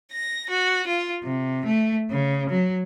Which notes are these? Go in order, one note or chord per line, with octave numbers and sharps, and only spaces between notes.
A#6
F#4
F4
C3
A3
C#3
F#3